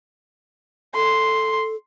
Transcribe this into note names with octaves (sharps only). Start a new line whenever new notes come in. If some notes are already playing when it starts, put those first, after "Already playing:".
A4 C6